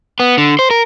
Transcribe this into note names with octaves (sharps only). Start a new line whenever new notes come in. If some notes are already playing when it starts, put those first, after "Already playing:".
B3
D3
C5
A#4